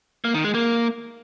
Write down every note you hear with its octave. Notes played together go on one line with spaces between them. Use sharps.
A#3
D#3
G#3
A#3